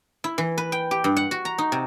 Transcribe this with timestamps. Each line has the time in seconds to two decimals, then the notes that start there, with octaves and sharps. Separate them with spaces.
0.24 E4
0.38 E3
0.58 B4
0.72 G5
0.91 G4
1.04 G2
1.17 F#5
1.31 F#4
1.45 A#5
1.58 D#4
1.72 C3